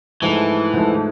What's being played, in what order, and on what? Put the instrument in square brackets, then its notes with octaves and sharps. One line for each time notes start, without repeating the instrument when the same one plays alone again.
[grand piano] G#2 F3 A3 [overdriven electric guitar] E3
[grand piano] G#2 F3 A3